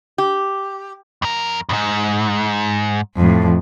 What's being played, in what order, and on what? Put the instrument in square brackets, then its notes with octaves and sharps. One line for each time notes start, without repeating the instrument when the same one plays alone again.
[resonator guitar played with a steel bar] G4
[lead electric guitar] F2 A#4
F2 G#2
[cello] F2 A2